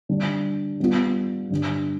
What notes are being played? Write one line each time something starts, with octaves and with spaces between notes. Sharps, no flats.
D3 G3 D4
G3 B3 F4
G2 D3 G3